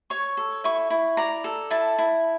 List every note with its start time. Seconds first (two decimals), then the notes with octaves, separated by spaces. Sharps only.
0.10 C#5 C#6
0.37 A4
0.64 E4 C#6
0.90 E4
1.17 D5 A#5
1.44 A4
1.70 E4 A5
1.98 E4